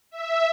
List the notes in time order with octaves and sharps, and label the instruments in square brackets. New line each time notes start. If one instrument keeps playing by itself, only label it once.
[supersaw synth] E5